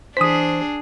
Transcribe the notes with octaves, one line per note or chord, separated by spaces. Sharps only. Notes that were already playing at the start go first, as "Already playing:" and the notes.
E3 D4 G#4 C5 D#6 B6